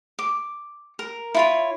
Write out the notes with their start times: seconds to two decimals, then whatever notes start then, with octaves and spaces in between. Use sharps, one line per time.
0.19 D6
0.99 A#4
1.34 E4 F4 C#5